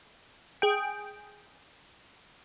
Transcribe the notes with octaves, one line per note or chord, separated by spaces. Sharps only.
G#4 G5